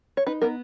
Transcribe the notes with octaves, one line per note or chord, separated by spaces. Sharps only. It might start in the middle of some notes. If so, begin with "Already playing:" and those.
C#5
D#4 B4
B3 A#4